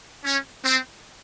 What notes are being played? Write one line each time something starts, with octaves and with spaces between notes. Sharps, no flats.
C#4
C4